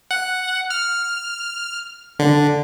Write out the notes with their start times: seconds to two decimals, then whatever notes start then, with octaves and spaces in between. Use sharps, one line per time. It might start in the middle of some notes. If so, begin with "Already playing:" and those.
0.11 F#5
0.70 F6
2.19 D3